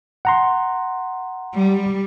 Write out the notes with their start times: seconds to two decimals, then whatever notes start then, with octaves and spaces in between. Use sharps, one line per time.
0.25 F#5 A#5 C6
1.53 G3